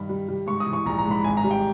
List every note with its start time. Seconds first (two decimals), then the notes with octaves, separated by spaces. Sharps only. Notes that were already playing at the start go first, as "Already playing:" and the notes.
Already playing: G2 D#3 B5
0.09 G3
0.28 G3
0.47 G#2 C#6
0.60 D#6
0.66 E3
0.73 C#6
0.86 A#1 A#5
0.99 A#5
1.05 G#2
1.11 B5
1.24 G#1 G#5
1.37 A#5
1.44 G3
1.51 G5